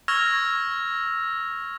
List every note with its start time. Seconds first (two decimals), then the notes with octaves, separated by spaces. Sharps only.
0.08 C#6 E6 F6 G#6 A#6 F7